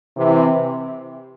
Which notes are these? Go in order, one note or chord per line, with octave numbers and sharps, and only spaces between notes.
C3 E3